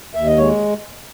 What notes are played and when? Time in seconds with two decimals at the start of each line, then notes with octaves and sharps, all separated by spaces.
0.15 D#2 E5
0.26 D#5
0.37 G#3 C#5